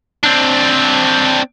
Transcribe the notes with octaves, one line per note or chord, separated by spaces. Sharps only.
C4 D4